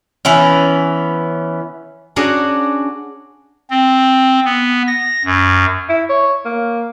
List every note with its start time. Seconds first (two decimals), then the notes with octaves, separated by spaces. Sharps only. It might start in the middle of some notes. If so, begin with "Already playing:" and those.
0.25 E3 B3 C#4
2.16 C#4 D4 F#4 G#4 F#5 A#5
3.70 C4
4.45 B3
4.87 A#6
5.25 F#2
5.89 E4
6.09 C#5
6.45 A#3